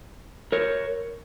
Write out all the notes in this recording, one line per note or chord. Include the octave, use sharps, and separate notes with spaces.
A#4 C#5